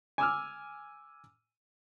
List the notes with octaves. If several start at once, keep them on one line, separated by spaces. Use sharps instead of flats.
G#5 D6 E6 F6